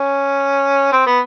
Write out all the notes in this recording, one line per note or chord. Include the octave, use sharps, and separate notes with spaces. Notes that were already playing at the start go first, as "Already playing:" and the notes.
Already playing: C#4
C4
B3